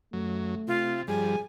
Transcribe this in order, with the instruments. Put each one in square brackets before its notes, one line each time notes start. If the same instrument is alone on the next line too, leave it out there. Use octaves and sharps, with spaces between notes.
[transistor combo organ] F#2 F#3 [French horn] A3
[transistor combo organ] C3 [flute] F4
[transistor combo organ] G2 F3 G3 [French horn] G#4 [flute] G#5